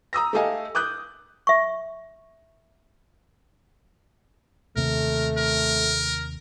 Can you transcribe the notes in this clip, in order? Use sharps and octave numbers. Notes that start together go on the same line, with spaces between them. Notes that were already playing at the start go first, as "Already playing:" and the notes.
A#5 D#6 E6 A#6
A3 G4 A4 D#5 F5 G#5
D6 D#6 F#6 G6
E5 C#6
D#2 C3 A3 C4 A#4
A#4